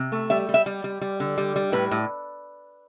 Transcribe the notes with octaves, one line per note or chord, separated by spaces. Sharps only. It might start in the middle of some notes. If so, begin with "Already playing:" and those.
Already playing: C3
A3
G3 E5
G3
E5
G3
G3
G3
D3
G3
G3
A2 B4
A2